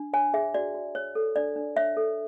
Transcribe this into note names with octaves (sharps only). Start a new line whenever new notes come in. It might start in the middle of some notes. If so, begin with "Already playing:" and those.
Already playing: D4
C#5 G#5
G#4 E5
F#4 D5
F#4
C#5
A4
D4 D5
D4
C#5 E5
A4